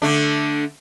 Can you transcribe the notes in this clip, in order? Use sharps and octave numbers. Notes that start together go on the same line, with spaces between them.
D3 A3 D4